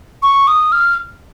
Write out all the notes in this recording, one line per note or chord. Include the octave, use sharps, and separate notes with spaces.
C#6
D#6
F6